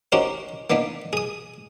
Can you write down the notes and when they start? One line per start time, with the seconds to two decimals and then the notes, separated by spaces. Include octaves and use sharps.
0.12 C#4 D#4 F#4 G4 A#4 C5
0.70 A#3 B3 D4 D#4
1.13 G#4 D#6